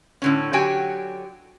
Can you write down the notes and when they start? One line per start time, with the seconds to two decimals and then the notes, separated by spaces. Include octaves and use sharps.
0.22 A2 D3 C#4
0.53 D3 F#3 F#4 G4 G5 G#5